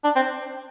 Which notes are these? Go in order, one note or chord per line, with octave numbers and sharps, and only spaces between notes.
D4
C4